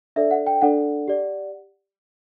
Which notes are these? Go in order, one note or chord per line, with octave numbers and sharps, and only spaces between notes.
D4 A4 D5 E5
F#5
G5
D4 A4 D5 F#5
G4 D5